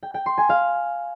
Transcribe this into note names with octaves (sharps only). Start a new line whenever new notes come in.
G5
G5
C6
G#5
F5